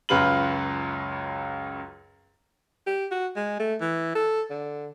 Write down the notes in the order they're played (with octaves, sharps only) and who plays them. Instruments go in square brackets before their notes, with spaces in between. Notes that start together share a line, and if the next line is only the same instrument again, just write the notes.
[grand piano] C#2 F#2 F4 B4 F#7
[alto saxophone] G4
F#4
G#3
A3
E3
A4
D3